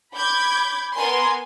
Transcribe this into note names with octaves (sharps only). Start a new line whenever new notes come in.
B5 D6 G6 G#6
B3 A#4 G#5 C6